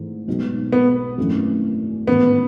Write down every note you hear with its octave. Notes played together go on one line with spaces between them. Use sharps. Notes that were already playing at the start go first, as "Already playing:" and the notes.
Already playing: G#1 G#2 E3 A3
B1 B2 G#3 D#4 F#4
B3
G#1 F#2 E3 A3 C#4
A1 G#2 D#3 B3